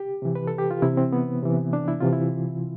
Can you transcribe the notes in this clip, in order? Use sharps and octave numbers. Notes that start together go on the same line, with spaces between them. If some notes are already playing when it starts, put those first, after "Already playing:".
Already playing: G4
C3 E3
B4
A4
G4
F4
C3 E3 E4
C4
B3
C3 E3
D4
E4
C3 E3 F4
E4